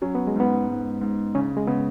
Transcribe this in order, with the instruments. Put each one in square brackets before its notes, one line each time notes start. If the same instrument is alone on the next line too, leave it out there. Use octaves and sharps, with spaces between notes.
[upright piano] F#3 [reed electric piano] C#4
[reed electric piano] B3
G#3
[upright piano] G#2 [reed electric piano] B3
[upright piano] G#2
G#2
[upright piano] C#3 [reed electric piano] C#4
[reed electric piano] G#3
[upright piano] C#3 [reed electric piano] B3